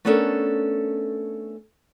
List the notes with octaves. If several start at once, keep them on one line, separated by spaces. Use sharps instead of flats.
A3 B3 C#4 D4 A4 A#4